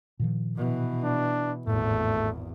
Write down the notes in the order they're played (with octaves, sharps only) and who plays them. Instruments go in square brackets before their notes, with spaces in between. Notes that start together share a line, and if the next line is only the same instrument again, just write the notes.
[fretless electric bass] A#2 D#3 F3
[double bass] B2 E3
[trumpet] D4
[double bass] G#1 E2 [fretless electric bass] A2 [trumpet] A3